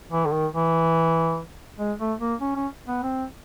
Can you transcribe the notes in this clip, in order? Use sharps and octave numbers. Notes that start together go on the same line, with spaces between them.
E3
D3
D#3
E3
G#3
A3
A#3
C#4
C#4
B3
C4